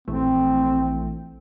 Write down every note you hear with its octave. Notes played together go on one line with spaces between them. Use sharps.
A#1 E3 A3 C4